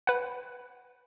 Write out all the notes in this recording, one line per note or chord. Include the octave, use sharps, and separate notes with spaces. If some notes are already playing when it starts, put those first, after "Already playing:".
B4 F#5